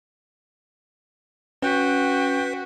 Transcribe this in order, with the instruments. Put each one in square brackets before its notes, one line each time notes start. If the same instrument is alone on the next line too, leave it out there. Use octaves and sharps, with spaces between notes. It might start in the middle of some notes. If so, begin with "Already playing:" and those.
[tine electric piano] C#4 [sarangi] F#4 [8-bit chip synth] B4 B6 [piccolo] G5